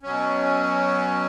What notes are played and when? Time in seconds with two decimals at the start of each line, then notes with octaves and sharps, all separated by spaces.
0.03 B2 F#3 C#4